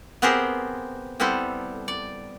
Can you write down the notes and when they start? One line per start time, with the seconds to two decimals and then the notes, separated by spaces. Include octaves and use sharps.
0.22 B3 C4 G4 G#4 A#4 C5
1.20 G3 B3 C4 E4 A4
1.88 D5